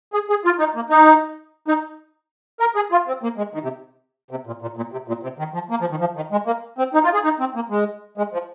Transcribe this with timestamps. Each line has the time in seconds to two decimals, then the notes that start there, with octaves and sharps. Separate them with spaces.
0.14 G#4
0.30 G#4
0.45 F4
0.59 D#4
0.75 A#3
0.90 D#4
1.68 D#4
2.60 A#4
2.76 G#4
2.92 F4
3.08 C4
3.23 A#3
3.38 G#3
3.54 D#3
3.63 C3
4.31 C3
4.47 A#2
4.62 A#2
4.77 A#2
4.92 C3
5.08 A#2
5.23 C3
5.39 D#3
5.54 F3
5.70 A#3
5.81 F3
5.91 D#3
6.00 F3
6.16 D#3
6.32 G#3
6.47 A#3
6.78 C4
6.94 D#4
7.04 F4
7.14 G#4
7.24 D#4
7.40 C4
7.55 A#3
7.70 G#3
8.18 G#3
8.33 F3